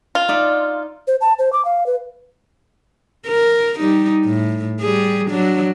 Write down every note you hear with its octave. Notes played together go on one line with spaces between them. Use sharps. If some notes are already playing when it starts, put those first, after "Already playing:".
F4
D#4 D5 E5
C5
A5
C5
D6
F5
B4
A#4
G3 D#4
A2
G3 G#4
F#3 D4